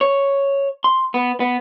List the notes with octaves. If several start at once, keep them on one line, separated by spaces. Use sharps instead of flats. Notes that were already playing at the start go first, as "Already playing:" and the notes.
C#5
C6
B3
B3